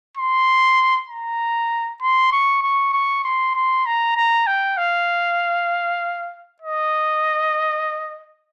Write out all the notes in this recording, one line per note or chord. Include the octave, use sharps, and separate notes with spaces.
C6
A#5
C6
C#6
C#6
C#6
C6
C6
A#5
A#5
G5
F5
D#5